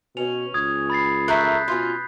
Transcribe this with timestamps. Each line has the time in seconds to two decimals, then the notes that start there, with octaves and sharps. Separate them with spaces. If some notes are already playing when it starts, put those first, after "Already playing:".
0.17 B2 C#4 F7
0.54 C#2 D#6 G#6
0.90 B5 A6 C7
1.28 A3 A#4 E5 F#6 G6 B6
1.68 B2 C#4 F4